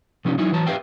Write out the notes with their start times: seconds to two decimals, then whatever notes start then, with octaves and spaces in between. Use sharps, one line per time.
0.25 C3 F3 C#4 D#4 G4
0.38 F#3 D#4 E4
0.52 E3 F#3 A5 A#5
0.67 G4 B4 E5 F5 G5